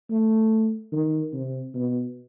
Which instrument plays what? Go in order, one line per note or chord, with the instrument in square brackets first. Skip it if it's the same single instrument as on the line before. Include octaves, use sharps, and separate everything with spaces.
[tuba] A3
D#3
C3
B2